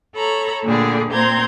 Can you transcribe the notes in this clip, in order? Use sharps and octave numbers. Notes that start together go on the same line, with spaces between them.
A4 C#5 A#5 B5
A#2 D3 G3 A3 G#4 D5
A#2 C4 C5 A#5 G6 G#6